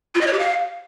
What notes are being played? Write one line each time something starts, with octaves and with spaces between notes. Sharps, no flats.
F4
D#5
C#5
G4
F5